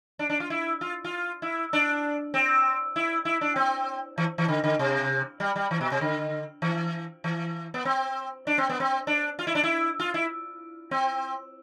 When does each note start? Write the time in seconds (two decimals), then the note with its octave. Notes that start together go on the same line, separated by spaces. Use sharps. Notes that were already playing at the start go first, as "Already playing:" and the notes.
0.19 D4
0.30 D4
0.40 F4
0.50 E4
0.81 F4
1.04 F4
1.42 E4
1.73 D4
2.34 C4
2.96 E4
3.25 E4
3.41 D4
3.56 C4
4.18 E3
4.38 E3
4.48 D3
4.64 D3
4.79 C3
5.40 G3
5.56 G3
5.71 E3
5.81 B2
5.92 C3
6.01 D3
6.62 E3
7.24 E3
7.74 B3
7.85 C4
8.47 D4
8.58 C4
8.69 B3
8.80 C4
9.07 D4
9.39 F4
9.47 E4
9.55 D4
9.64 E4
9.99 F4
10.14 E4
10.91 C4